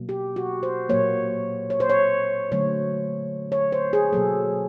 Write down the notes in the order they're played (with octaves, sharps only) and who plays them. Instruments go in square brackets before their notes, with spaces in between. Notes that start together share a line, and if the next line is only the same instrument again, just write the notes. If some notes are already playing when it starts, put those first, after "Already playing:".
Already playing: [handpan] B2 F#3 A#3
G4
F#4
C5
A#2 F#3 A#3 C#5
C#5
C5
C#5
D3 F#3 A3 C#5
C#5
C5
G#4
B2 F#3 A#3 A4